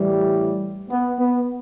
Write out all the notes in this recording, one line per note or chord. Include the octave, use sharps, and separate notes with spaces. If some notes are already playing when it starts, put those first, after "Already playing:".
Already playing: A2 E3 G3
B3
B3